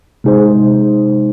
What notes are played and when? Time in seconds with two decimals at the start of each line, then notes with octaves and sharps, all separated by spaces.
0.24 C3 G#3 D#4 G#4 C5